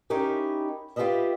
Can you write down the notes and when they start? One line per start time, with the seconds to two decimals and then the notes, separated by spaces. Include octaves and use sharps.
0.10 C#4 D#4 E4 G4 A#4
0.96 F4 G4 A4 B4 D#5 E5